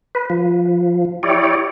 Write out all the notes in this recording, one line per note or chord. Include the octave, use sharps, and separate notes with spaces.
B4
F3
E4 G4 C#5 D5